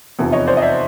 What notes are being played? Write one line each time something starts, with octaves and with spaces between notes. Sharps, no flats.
F1 E2 C3 F3
C#5 D#5
C5 D5
D#5
D5 E5